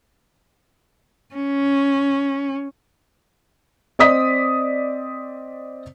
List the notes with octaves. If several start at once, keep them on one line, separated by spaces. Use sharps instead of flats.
C#4
C4 D5 D#5 D#6 B6